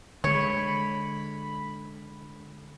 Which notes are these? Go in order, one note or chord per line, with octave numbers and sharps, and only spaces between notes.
D3 G#3 C#5 B5